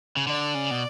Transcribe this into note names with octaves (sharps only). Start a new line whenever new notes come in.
C#3
D3 D5
C#3
B2